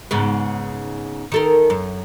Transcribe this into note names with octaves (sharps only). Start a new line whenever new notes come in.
G#2 C#3 B3
D#3 A4 A#4
F#2